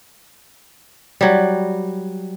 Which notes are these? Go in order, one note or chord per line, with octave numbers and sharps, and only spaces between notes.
F#3 G3